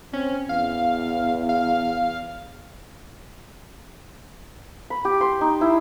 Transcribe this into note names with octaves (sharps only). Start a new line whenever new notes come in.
C4 C#4
E2 F5
F5
B5
G4
C6
D#4
E4